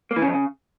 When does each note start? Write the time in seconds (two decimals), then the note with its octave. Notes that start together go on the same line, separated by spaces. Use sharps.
0.11 A#3
0.16 E3
0.22 C#3
0.27 F2
0.33 C#3